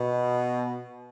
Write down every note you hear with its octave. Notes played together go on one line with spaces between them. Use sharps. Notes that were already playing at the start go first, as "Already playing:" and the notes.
Already playing: B2